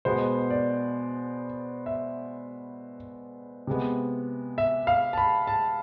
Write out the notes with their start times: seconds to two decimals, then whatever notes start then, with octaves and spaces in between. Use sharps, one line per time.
0.05 B2 G#3 B3 C5
0.50 D5
1.86 E5
3.67 C3 G#3 B3
4.58 E5
4.87 F5
5.13 A5
5.18 B5
5.47 A5